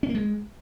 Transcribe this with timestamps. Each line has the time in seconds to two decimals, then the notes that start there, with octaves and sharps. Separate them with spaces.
0.03 C#4
0.09 A#3
0.15 G#3